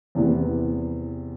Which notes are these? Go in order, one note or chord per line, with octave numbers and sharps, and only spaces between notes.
E2 C3 E3 B3